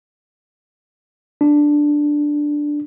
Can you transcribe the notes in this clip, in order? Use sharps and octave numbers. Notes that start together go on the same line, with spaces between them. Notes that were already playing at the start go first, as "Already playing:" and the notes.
D4